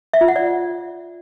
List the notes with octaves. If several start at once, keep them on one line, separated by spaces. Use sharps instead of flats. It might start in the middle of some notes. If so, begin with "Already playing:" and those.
E5
F4
F#5
D5